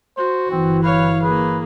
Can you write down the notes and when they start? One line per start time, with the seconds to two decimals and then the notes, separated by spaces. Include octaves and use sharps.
0.17 F#4 C5
0.51 G1 E3 C4
0.83 B4 C#5 F5
1.23 A#3 G#4 B4